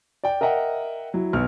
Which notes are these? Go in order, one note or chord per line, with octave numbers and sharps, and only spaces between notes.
D5 G5
A#4 D#5 E5 F#5 G5
F#3 E4
B1 B3 F6